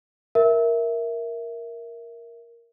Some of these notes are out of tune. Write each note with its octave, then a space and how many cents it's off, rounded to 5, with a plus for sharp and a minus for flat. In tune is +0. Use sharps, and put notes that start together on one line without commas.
A#4 +0 E5 +0